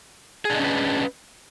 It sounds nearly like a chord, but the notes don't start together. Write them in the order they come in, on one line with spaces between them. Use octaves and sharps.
G#4 D4 D#5 C#4 B4